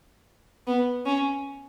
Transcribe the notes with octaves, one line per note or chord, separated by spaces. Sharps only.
B3
C#4